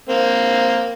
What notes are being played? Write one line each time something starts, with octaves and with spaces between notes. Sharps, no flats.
A#3 C4